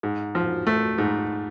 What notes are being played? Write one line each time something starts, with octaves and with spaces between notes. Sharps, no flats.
G#2
F3
A3
G#2